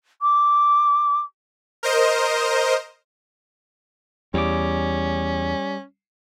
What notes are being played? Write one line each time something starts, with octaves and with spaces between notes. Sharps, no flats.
D6
A#4 C5 D#5
E2 G3 C#4 D6